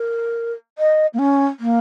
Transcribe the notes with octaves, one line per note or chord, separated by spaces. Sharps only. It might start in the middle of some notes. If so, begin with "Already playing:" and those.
Already playing: A#4
D#5
A#3
C#4
A#3